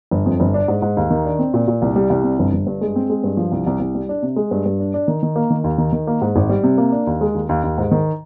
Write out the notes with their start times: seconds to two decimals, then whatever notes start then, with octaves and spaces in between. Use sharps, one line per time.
0.11 G1
0.26 F2
0.40 G1
0.54 D4
0.68 G#2
0.82 G#2
0.97 D#2
1.10 D#3
1.25 D4
1.39 C4
1.54 A#2
1.68 A#2
1.82 C2
1.96 G3
2.10 C2
2.24 C3
2.39 G1
2.53 G1
2.67 G2
2.81 G#3
2.96 C4
3.10 G#3
3.24 G2
3.37 F3
3.52 C2
3.67 C2
3.80 C2
3.95 G3
4.09 D4
4.22 C3
4.36 G#3
4.51 G2
4.65 G2
4.80 D4
4.94 D4
5.08 D#3
5.23 D#3
5.36 A#3
5.50 D#3
5.64 D#2
5.78 D#3
5.93 D#3
6.07 A#3
6.21 G#2
6.36 G#1
6.49 G3
6.63 C3
6.78 A#3
6.92 D4
7.07 D#2
7.21 G#3
7.35 D#2
7.49 D#2
7.64 D#2
7.78 G#2
7.91 D#3